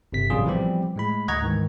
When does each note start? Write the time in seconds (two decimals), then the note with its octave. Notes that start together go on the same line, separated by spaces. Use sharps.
0.12 G1 C3 B6
0.30 A1 C3 F#3 G3 F4 G#4
0.46 E3 F3 G3 B3 C4 G4
0.96 A2 G#3 B5
1.28 D2 D#5 F#5 A#5 C#6 G#6
1.42 G#2 D#3 E3